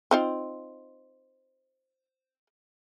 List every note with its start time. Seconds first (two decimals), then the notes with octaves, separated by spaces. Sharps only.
0.11 C4 D#4 F4